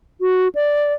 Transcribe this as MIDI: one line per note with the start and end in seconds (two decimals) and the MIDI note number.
0.21 0.48 66
0.55 0.93 74